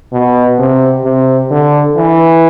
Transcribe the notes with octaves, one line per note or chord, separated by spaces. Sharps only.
B2
C3
C3
D3
E3